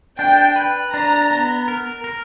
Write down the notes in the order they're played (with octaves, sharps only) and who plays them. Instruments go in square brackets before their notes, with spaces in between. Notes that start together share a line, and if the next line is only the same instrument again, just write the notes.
[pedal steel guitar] D4 [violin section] G5
[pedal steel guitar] B4
[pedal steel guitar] D4 [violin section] A#5
[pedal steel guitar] B3
A#4
A#4